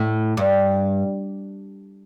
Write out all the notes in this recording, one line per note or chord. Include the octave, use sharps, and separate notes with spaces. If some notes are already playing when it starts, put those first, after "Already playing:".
Already playing: A2
G2